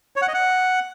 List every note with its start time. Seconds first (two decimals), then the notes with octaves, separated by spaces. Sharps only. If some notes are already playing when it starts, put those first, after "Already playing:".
0.16 C#5
0.22 F#5
0.28 D#5
0.34 F#5